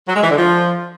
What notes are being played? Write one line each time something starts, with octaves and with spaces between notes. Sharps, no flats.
F#3
G#3
E3
D3
F3